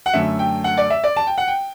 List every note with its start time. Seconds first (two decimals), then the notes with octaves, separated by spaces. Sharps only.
0.06 F#5
0.13 F#2 D3 A3 E5
0.39 G5
0.64 F#5
0.78 D5
0.90 E5
1.04 D5
1.16 A5
1.27 G5
1.38 F#5
1.48 G5